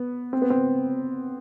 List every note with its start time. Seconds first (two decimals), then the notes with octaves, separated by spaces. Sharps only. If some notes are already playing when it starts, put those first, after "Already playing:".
Already playing: B3
0.33 C4
0.42 B3
0.50 C4